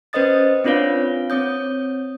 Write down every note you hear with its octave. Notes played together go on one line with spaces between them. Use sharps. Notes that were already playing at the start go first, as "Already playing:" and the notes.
C#4 B4 C5 D#5 D#6 A6
C4 D4 F4 B4 C#5 F5
C4 C#5 D#6 G6